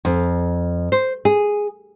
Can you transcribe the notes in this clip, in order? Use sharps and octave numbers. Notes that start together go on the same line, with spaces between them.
F2
C5
G#4